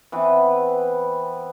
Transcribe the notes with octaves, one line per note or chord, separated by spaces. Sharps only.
E3 B3 C4 B4